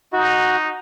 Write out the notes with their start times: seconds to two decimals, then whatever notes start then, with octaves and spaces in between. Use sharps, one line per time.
0.13 D#4 F#4